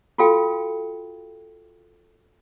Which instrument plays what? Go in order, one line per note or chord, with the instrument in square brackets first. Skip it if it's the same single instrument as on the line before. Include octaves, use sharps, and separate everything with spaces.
[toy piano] F4 F#4 A4 F5 G5